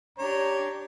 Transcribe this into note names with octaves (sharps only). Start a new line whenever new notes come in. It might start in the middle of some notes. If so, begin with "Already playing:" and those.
D4 G4 C#5 A#5